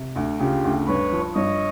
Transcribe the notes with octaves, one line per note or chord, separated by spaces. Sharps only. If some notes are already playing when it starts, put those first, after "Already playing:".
Already playing: C3
D2
C#3 F4 G4
D2
G2 B4 C#5
F3
G2 C#5 D#5